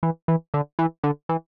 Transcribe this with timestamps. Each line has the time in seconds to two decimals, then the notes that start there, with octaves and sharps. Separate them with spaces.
0.03 E3
0.28 E3
0.54 D3
0.79 E3
1.03 D3
1.29 E3